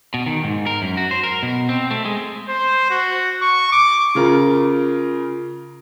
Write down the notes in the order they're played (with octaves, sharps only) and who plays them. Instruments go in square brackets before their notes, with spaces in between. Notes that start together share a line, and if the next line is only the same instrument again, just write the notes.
[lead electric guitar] B2
D#3
G#2
A#4
F#2
F#4
C5
A#4
B2
C4
A3
G#3
[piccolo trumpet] C5
F#4
C#6
D6
[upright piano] C#3 F4 A#4